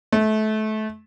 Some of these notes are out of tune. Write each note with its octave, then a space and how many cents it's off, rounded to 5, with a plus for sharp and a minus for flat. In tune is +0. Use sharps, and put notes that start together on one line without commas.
A3 -25